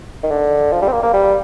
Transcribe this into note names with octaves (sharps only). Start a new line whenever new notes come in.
D#3
D3
F3
G3
C4
A#3
A#3
G3